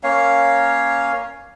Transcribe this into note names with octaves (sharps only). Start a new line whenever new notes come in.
A#3 C#4 C#5 F5